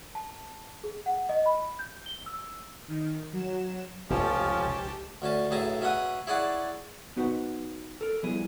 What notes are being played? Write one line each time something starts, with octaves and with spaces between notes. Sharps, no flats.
A5
G#4
F#5
D#5
B5
G6
G7
E6
D#3
F#3 E7
F1 C#2 F3 C#4 G4 A5
D2 C#4 A5
B1 A2 G#4 E5 A5 A#5
B2 C#4 E5 F#5 D#6
E4 G#4 C#5 D5 F#5 A5
B3 D#4 F#4 B4 C5 F#5
A4 A#4
F3 G3 B3 E4 G#4